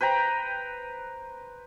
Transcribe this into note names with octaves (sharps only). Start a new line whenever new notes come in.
B4 C5 G5 A#5